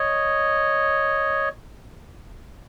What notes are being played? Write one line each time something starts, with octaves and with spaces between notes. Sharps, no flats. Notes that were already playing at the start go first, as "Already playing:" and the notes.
Already playing: C#5 D#5